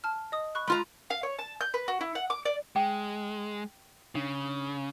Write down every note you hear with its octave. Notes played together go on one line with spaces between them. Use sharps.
A5 F6
D#5 D#6
B5 C#6 F#6
G#3 F4 A#5 B5 F6
F5
C#5
A5
G6
B4
F#4
E4
F#5
D6
D5
G#3 G5
C#3 D4